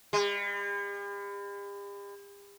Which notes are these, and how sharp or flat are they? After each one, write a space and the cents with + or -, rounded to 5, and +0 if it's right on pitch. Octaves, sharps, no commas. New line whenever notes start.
G3 +45